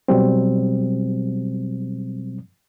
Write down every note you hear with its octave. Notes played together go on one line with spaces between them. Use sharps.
B2 F#3 G3 C4